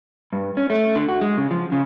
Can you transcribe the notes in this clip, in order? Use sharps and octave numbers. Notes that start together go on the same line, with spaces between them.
G2
C#4
A3
D3
F#4
G#3
C#3
F3
C#3